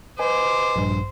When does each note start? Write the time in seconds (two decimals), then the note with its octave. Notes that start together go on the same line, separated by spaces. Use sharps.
0.19 B4 C5 D#5 G#5 D6
0.76 A#1 G2